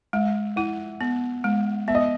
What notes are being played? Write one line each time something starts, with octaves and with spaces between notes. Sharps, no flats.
G#3 E5
E4 F#5
B3
G#3
B3 E5
D#5